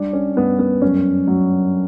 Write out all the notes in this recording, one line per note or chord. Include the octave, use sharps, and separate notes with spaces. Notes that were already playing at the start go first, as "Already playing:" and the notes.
Already playing: G3 D4
C#4
G2 B3
B3
F#2 C#4
F#3